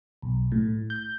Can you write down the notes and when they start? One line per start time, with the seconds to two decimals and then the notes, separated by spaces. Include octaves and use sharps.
0.22 B1
0.52 A2
0.90 G6